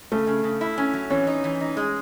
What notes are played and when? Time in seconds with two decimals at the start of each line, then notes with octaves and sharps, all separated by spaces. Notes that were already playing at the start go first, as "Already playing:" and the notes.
0.12 C#3 A3
0.27 C#3
0.44 C#3
0.61 E4
0.78 C#4
0.94 F#3
1.10 E3 C#4
1.27 D#4
1.44 E3
1.60 D#4
1.77 G#3